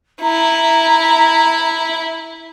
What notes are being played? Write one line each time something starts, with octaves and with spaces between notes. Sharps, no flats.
E4 A#5